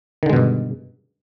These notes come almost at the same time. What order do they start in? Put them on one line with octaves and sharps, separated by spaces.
D#3 D3 G#3 B2 G2